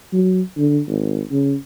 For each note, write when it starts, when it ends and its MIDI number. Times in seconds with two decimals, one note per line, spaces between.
0.13 0.41 54
0.57 0.80 50
0.88 1.22 32
1.31 1.56 49